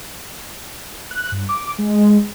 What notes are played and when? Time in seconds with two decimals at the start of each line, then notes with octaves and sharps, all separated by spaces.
1.11 F#6
1.32 G2
1.49 D6
1.78 G#3